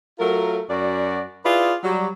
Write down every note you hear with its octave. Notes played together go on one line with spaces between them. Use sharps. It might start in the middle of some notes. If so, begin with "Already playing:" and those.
F#3 A3 F4 A#4
F#2 F#4 D5
E4 F4 G#4 B4 D5
F#3 G3